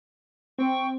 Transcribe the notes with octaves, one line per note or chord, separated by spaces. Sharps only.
C4 G5 C#6